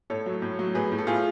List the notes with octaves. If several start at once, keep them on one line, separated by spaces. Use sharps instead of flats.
A2 A4 C#5
F#3
A2
F#3
A2 G#4 B4
A2
A4
A2 F4 G#4